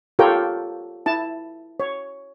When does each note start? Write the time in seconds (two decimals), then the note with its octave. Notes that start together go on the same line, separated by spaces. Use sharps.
0.19 F4 G4 A4 A#4 C#5 G5
1.06 E4 A5
1.80 C#5